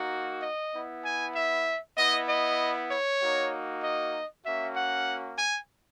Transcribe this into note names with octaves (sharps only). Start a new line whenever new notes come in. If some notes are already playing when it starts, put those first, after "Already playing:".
Already playing: A#3 D#4 F#4
D#5
B3 E4
G#5
E5
B3 E4 D#5
D#5
C#5
A#3 D#4 F#4
D#5
A#3 C#4 F#4 E5
F#5
G#5